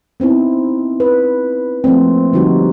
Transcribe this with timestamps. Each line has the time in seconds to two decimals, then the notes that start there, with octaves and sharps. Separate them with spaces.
0.20 B3 C4 D#4 E4
1.00 B4
1.84 F3 A3 A#3 C4
2.33 D3 F3 G3 D#4 F#4 G4